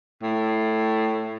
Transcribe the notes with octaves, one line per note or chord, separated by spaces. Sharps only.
A2